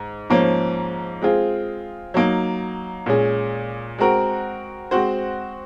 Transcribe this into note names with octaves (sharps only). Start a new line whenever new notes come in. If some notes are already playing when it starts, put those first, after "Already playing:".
Already playing: G#2
G#2 F3 A#3 C#4
G#3 C4 F4 G#4
F#3 A#3 D#4
A#2 G#3 C#4 G#4
G#3 C4 F#4 A#4
G#3 C4 F#4 C5